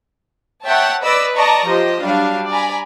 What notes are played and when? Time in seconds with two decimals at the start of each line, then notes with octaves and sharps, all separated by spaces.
0.65 C#5 E5 F#5 G5 A5
1.02 B4 D5 D#5 B5 D6 E6
1.35 D5 D#5 A5 A#5 C#6
1.66 F3 G4 C5 D#5
2.03 F#3 G3 D4 F5
2.51 D5 G#5 A#5 B5